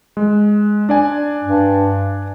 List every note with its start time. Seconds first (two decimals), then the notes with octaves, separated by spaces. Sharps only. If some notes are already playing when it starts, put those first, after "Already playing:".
0.17 G#3
0.89 D4 D5 G#5
1.44 G2